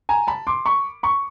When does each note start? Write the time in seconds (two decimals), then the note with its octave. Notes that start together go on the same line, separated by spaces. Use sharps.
0.09 G#5 A#5
0.27 A5 B5
0.47 C6 D6
0.66 B5 C#6
1.03 B5 C#6